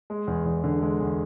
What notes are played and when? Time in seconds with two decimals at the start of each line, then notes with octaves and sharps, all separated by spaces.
0.10 G#3
0.27 E2
0.46 E2
0.64 D3
0.82 G#3
1.00 E2